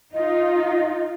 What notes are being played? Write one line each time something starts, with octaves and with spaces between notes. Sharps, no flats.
D#4 F4 D#5